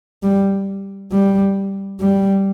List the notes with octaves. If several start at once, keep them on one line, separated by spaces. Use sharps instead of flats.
G3
G3
G3